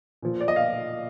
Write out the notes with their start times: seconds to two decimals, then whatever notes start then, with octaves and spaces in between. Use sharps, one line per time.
0.22 A#2 F3
0.41 D5
0.48 D#5
0.56 F5